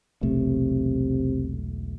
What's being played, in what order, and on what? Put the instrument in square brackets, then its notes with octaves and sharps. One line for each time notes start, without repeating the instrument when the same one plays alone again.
[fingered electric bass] E1 B1 A3 [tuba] C3